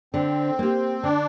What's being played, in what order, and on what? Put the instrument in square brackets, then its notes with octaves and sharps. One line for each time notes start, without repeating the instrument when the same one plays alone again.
[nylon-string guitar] D3 [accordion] C4
[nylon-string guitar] A#3 G4
[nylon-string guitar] D3 [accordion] D4